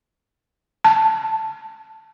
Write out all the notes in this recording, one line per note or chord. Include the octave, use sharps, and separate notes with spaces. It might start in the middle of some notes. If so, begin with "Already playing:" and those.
A5